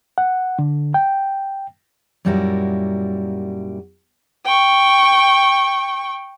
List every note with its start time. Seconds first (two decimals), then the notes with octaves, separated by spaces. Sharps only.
0.18 F#5
0.59 D3
0.94 G5
2.25 F#2 A#2 G3 E4 F#4 A#4
4.45 G5 C#6